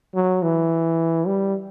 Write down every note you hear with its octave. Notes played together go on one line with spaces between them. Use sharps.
F#3
E3
G3